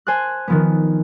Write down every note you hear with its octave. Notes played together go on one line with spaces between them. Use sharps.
C5 G#5 A5 F#6
D#3 F3 B3